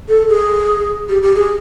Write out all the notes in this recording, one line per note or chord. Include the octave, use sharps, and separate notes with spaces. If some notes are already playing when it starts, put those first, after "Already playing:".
A4
G#4
G4
G4
G#4